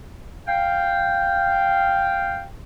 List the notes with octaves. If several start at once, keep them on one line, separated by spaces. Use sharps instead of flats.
F5 G5